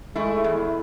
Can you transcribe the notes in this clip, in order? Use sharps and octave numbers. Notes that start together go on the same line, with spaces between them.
G#3 A3 E4
E2 E4